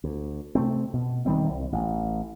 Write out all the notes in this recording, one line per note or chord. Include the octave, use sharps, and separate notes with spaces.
D2
C3 A3 C4
B2
E1 D#3 G3 C4
C2
A1